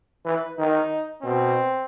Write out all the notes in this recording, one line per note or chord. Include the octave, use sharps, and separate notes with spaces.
E3 B4
D#3 D#4
B2 C4